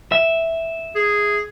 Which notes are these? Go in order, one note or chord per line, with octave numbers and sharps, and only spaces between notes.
E5
G#4